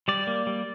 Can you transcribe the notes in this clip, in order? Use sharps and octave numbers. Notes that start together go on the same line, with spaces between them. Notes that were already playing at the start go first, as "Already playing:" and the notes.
G3 D5
A#3
G3